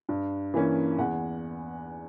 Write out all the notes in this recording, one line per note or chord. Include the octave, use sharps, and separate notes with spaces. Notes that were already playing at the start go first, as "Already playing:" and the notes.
G2
E3 A#3 C#4
E2 F#5